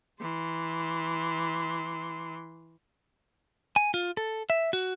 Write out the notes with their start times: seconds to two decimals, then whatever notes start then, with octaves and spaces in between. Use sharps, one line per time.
0.21 E3 C6
3.76 G#5
3.94 F4
4.17 A4
4.50 E5
4.73 F#4